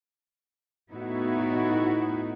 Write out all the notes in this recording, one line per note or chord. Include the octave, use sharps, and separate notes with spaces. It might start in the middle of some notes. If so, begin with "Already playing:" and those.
A2 B3 D#4 E4 F#4 E5